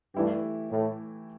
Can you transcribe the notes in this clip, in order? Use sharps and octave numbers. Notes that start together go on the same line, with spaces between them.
G2 E3 A3 E4 G4
A2